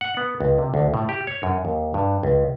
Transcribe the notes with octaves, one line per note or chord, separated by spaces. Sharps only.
F#5
B3
C#2
C3
D2
A2
G4
C#5
F#2
D#2
G2
C#2